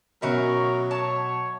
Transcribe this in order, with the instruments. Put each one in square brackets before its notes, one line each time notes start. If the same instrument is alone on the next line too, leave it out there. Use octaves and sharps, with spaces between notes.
[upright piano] B2 E5 B5 [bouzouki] D#3 C#4 F#4 [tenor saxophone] F#3 [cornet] A#4
[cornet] C#5 [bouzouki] A5